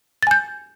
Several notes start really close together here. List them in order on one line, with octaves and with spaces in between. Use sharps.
A6 G#5 G6